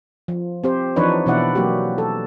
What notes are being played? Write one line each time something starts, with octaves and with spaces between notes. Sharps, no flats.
F3
C4 G4 C5
E3 F3 D4 D#4 B4 C#5
B2 E3 D4 E4 D5 F#5
F#3 A#3 F#4 G4
A4